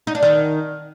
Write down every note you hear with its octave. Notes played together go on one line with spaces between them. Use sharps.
D#4
D4
D#3